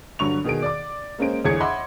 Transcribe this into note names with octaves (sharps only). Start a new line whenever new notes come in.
G2 D3 F#3 C#6 F7
B2 D#3 G#4 D7
D5 D6
G#3 A#3 C#4 C5 D7
G1 E2 G#4 G#6 C#7
D#5 E5 F#5 B5 C6 D6